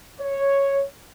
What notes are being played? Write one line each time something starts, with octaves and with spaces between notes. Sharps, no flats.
C#5